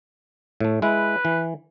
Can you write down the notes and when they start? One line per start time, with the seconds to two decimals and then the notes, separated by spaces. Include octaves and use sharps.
0.61 A2 A3
0.82 G#3 E4 B4
1.25 E3